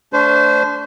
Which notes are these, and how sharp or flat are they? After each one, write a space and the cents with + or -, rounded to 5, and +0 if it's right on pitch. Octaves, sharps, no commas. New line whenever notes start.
A3 +0 D4 -30 C5 -20